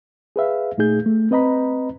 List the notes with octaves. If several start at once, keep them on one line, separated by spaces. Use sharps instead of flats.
G#4 B4 E5 F5
A#2 A3 D#4 G#4 G6
A3
C4 B4 D#5 A#5 B5